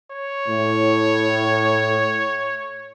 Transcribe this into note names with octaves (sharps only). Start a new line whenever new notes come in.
C#5
A2